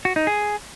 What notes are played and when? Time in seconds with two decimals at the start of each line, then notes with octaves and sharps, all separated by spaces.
0.05 F#4
0.16 D#4
0.27 G#4